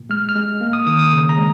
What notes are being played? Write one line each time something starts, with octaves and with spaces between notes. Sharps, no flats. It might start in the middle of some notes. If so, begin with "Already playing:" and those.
Already playing: A#2
G#3 F6
F6
G#3
A#3
D#6
D#3 D#6
D#6
C#3
A#5
G#3